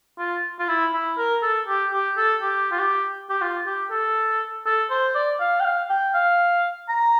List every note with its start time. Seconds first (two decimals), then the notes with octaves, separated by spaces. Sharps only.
0.19 F4
0.59 F4
0.68 E4
0.93 E4
1.18 A#4
1.42 A4
1.67 G4
1.92 G4
2.17 A4
2.42 G4
2.72 F4
2.79 G4
3.30 G4
3.41 F4
3.66 G4
3.91 A4
4.66 A4
4.90 C5
5.15 D5
5.40 F5
5.60 G5
5.65 F5
5.90 G5
6.14 F5
6.89 A#5